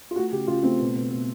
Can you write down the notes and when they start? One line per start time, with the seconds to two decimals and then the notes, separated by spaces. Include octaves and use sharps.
0.11 F4
0.16 A3 F#4
0.32 C#3 G4
0.47 C#3 F4
0.63 A3 C4
0.79 B2
0.96 B2
1.11 B2